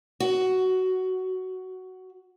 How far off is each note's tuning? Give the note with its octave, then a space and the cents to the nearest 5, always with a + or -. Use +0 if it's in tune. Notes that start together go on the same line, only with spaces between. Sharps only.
F#4 +10